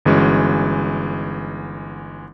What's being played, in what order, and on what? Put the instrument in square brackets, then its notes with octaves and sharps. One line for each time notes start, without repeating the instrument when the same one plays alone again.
[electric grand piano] G1 E3 G#3 C#4 F#4